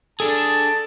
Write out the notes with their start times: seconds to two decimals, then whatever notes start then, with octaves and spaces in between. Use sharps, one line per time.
0.20 D4 G#4 A4 A5